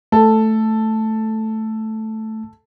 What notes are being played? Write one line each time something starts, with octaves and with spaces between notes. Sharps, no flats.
A3 A4